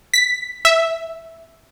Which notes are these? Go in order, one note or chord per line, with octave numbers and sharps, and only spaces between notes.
B6
E5